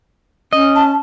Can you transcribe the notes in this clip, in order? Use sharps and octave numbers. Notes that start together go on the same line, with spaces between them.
C#4 D#5
A5